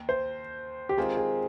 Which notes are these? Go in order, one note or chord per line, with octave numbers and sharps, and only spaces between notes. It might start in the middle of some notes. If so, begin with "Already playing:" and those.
Already playing: D#2
C5
G4
D#3 G#3 C4 F4 G#4 C5
G#4